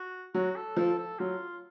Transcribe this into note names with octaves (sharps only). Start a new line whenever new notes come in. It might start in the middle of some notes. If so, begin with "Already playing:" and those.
Already playing: F#4
F#3 F#4
A4
F3 A4
A4
F#3 F4